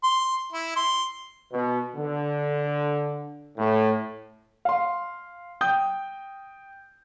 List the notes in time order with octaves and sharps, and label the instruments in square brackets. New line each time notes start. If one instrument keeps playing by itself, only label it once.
[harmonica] C6
E4
C6
[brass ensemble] B2
D3
A2
[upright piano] F5 C6
G5 D#6 G6